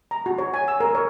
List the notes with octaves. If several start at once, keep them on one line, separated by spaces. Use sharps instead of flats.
A#5
F#4
C#5
G#5
E6
A#4
C#5